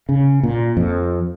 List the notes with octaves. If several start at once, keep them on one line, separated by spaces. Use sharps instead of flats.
C#3
A#2
F2